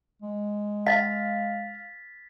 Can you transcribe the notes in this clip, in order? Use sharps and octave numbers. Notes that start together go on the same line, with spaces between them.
G#3
F5 A6 B6